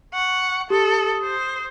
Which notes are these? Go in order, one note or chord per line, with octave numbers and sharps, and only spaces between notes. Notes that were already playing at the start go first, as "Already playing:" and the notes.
F#5 C#6
G4 A4 D#6
C5